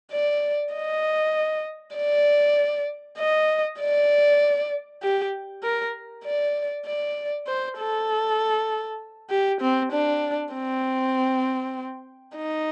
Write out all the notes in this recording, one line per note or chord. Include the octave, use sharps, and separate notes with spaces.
D5
D#5
D5
D#5
D5
G4
A#4
D5
D5
C5
A4
G4
C4
D4
C4
D#4